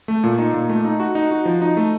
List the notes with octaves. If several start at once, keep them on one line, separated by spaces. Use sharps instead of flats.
A3
A#2
D#4
A#2
A3
D#4
F#4
D#4
F#4
F3
D#4
A3